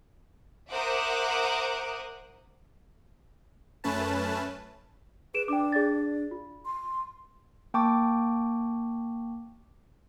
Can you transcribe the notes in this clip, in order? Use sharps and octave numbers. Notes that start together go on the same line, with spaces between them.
A#4 C5 E5 F#5 D6 D#6
F#2 A3 C#4 B4 A5
G#4 B4 D7 E7
D4 G5 D6
G#4 D5 A6
F4
C6
A#3 G5 A5 C#6 D6